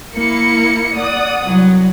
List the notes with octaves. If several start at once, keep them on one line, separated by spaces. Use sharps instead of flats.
A#3 E4 C#7
D5 F#5 D#6
C2 F#3